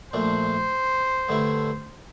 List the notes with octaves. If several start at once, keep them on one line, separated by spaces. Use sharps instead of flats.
A#1 A#2 A3 D4 C5
G2 D3 A3 E4